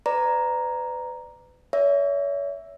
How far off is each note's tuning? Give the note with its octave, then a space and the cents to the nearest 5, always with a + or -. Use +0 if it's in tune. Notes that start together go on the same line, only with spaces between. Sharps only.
B4 +30 D5 +0 A#5 +0
C#5 +40 E5 +0